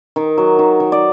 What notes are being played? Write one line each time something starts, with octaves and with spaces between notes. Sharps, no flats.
D#3
F#3
D#3
D#3
D5